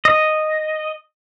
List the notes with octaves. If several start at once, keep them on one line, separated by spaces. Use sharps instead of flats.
D#5